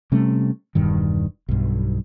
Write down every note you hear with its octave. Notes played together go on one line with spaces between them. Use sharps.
C3 G3 A3 C#4
E1 G2 D#3
B1 G2